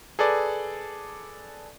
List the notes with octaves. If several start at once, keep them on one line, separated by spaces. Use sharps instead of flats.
G#4 A4 B4 D5